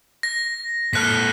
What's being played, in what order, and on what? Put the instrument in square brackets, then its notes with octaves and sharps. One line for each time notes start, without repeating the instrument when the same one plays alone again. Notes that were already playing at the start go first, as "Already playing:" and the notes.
[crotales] A#6
[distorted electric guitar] A#2 A4 [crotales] F6 F#6 B6